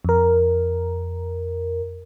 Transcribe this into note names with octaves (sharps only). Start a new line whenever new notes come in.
F2 A#4